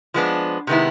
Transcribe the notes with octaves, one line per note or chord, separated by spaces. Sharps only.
F3 G#3 B3 D4
C3 D#3 G#3 B3 E4